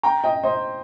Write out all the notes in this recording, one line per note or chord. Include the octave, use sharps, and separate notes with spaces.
G5 A#5
D#5 G5
C5 D#5